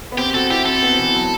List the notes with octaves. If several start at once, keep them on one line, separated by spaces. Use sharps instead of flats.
B3
C4 G4
F#4 A4
E4 G4
C4 A4
B3
E3
F#3